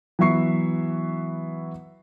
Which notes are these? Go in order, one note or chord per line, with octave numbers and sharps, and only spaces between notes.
E3 F#3 B3 E5 C#6 C7